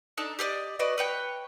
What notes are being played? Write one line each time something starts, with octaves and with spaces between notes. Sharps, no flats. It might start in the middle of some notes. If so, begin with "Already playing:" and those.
D4 D#4 A4
G4 A4 D5 D#5
F#4 B4 D5 D#5
B4 C#5 G5